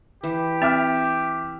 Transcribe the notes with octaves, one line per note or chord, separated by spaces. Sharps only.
E3 G4
C4 E5 D6 F6